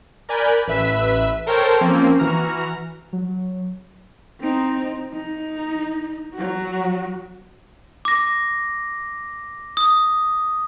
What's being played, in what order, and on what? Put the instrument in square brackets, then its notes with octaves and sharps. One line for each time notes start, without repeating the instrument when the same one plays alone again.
[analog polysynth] A#4 D5 G#5 B5 F#6 G6
A1 B4 E5 B6 E7
A4 A#4 C5 C#5 G5 A5
F3 A#3 C4 C#4
E3 F#4 A#5 F6
[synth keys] F#3
[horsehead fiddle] C4 D#4
D#4
F#3 F#4
[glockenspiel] D6 A#6
D#6